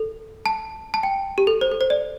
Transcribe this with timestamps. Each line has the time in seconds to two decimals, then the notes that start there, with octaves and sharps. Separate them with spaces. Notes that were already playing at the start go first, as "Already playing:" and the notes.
Already playing: A4
0.46 A5
0.94 A5
1.03 G5
1.38 G4
1.47 A4
1.61 C5
1.72 A4
1.81 C5
1.90 D5